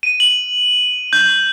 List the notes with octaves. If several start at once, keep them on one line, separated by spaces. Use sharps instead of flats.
D#7
F#7
G6